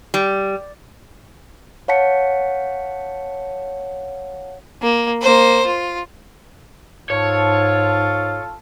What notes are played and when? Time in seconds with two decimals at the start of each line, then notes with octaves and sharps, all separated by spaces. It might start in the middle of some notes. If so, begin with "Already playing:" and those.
0.14 G3
1.88 C#5 F5 F#5 A5 B6 C#7
4.82 A#3
5.22 A#3 C5
5.66 F4
7.10 G#2 F4 A4 C#5 A5